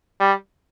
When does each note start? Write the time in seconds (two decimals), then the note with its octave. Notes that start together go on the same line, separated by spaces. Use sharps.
0.20 G3